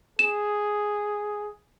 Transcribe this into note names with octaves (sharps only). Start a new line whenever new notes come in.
G#4 E7